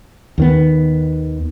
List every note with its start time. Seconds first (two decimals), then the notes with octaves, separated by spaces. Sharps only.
0.38 D#2 D#3 B3